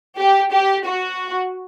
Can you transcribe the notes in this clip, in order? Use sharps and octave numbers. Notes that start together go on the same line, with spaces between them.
G4
G4
F#4